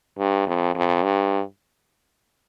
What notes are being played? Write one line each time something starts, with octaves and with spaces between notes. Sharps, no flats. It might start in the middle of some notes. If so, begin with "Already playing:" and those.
G2
F2
F2
G2